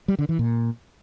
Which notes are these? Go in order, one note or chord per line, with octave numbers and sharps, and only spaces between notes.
G3
D3
E3
A#2